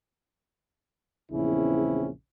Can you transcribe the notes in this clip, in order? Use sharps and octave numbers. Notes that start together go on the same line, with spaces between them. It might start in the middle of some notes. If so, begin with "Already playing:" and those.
A#1 E2 C#3 C4 C#4 E4